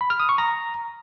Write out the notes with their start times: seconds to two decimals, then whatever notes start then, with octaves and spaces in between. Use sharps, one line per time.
0.01 B5
0.10 F6
0.20 D#6
0.29 C#6
0.38 A#5